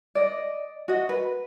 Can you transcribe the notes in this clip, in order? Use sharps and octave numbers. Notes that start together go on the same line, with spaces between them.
D5 D#5
F#4 D#5
B4